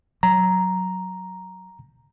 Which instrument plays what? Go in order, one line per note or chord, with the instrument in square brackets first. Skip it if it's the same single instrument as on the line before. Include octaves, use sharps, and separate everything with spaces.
[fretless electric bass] F#3 [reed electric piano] A#5